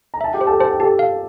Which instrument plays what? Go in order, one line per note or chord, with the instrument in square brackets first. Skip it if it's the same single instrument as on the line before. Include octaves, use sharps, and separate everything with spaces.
[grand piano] A#5
[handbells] E5 [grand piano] A5
[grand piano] G4 G5
[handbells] C5
[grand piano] A4 A5
[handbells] C5 [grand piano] A5
[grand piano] G5
[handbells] G4 [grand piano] A4 A5
[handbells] F5